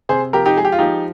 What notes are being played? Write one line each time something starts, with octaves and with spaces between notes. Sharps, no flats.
C3 G#4 C5
F3 G4 A#4
D#4 G4
G#3 G#4
G4
F4
F3 D#4 G4